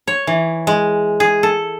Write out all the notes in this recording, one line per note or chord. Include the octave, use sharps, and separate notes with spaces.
C#5
E3
G#3
G#4
A4